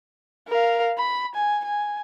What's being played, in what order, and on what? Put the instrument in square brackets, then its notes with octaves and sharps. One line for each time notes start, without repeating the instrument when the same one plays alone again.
[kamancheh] A#4 F5
B5
G#5
G#5